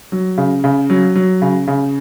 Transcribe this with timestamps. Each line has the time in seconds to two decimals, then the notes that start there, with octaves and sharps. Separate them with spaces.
0.12 F#3
0.38 C#3
0.64 C#3
0.90 F#3
1.15 F#3
1.42 C#3
1.68 C#3